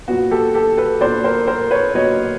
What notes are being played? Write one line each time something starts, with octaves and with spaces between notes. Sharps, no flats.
A#2 F#3 B3 F#4
G4 A4
G4 A4
A4 B4
A#2 F#3 B3 C5 D5
A#4 C5
A#4 C5
B4 C#5
A#2 F#3 B3 C#5 D#5